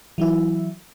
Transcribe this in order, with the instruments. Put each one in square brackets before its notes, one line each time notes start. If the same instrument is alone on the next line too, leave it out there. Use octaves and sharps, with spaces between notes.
[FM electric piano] E3 F#3 E4